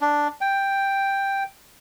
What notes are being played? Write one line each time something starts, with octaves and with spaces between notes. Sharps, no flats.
D4
G5